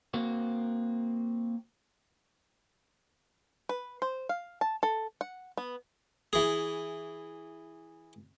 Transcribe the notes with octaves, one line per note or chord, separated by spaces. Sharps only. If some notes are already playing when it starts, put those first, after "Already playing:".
A#3 C4 F#4
B4
C5
F5
A5
A4
F#5
B3
E3 G#4